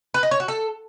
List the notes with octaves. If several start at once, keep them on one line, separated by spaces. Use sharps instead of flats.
B4
D#5
C#5
F#4
A4